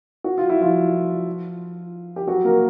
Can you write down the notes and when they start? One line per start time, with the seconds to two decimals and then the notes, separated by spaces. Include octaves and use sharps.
0.24 F#4
0.38 F4
0.50 E4
0.61 F3 F4
2.16 G4
2.27 F#3 F#4
2.44 A#3 A#4